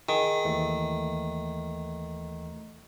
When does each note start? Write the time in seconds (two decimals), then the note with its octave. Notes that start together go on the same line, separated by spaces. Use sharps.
0.09 D#3 G#4
0.45 D#2 E3 A3